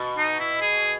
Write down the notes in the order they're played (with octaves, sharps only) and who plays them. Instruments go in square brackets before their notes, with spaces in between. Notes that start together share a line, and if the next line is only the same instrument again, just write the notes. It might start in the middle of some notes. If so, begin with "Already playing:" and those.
Already playing: [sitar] B2
[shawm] D#4
E4
G#4